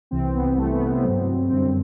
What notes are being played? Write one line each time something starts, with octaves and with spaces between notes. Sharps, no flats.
C2 C3 E3 C4
B3
C2 C3 E3 A3
B3
C4
G2 F#3
F#2 D3 G3 C4